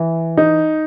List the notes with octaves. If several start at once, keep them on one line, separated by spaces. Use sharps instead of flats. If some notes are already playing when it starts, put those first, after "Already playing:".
Already playing: E3
D#4